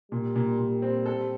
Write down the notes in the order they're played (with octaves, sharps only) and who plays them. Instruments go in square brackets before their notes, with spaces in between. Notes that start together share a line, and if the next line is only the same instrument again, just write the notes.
[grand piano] A#2 [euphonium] G3
[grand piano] A#2
A#2
C4
A4